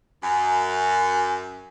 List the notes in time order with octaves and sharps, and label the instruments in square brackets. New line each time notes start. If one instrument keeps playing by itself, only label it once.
[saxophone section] F#2 [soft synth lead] G#5